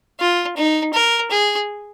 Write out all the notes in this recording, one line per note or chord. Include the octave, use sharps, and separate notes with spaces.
F4
D#4
A#4
G#4